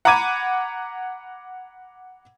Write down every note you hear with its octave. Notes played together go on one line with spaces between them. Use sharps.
F#5 A#5 B5 D6 G#6 D#7